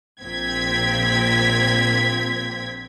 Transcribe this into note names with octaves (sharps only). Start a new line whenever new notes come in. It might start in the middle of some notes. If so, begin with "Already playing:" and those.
A#1 A#2 C4 G#6 B6